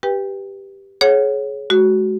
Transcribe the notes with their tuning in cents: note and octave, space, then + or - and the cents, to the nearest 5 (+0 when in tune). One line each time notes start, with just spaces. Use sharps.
G4 +0 B4 -10 G5 +25
G#4 +30 C#5 -10 F#5 +0
G#3 +30 F#4 +20